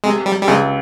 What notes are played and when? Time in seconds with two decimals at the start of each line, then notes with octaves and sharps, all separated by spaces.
0.04 C3 G#3
0.26 G3
0.42 G3
0.48 C#2 G#3